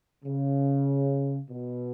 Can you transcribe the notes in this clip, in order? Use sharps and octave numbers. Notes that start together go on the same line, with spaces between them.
C#3
B2